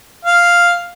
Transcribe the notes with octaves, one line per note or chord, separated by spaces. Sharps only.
F5